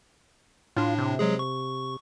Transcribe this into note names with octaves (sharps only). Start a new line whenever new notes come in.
A2 D4 F4
C3
F#3 G#3 G#4
C#6